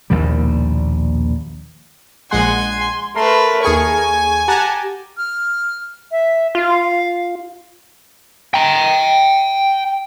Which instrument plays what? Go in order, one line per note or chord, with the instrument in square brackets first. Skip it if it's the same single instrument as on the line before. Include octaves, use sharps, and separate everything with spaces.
[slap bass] A#1 D#2 B2 G3
[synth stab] A#1 G#3 F#5 [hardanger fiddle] G#5 [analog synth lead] C6
[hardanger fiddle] A3 B4 [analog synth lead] A#4 [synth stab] C6
[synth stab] D#2 G#4 C#6 [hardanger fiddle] G#5
[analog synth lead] G4 [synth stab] F#5 A5 A#5
[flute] F6
E5
[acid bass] F4 [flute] F5
[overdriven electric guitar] G5 A#5